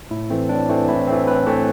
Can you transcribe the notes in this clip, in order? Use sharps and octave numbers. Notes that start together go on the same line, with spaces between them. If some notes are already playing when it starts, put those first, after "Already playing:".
A2 E4
E3 A3 C4
A2 D4
E3 A3 C4 D4
A2 E4
E3 A3 C4
A2 B4
E3 A3 C4